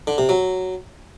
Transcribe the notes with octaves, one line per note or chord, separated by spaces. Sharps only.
D3
C3
F#3